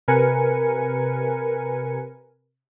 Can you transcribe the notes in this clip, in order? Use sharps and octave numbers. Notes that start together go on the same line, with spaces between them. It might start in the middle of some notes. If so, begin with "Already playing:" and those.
C3 A#4 B4 G#5 C#7